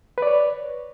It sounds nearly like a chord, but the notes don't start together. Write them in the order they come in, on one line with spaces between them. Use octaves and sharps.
B4 D5 C#5